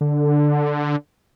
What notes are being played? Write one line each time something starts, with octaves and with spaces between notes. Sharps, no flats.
D3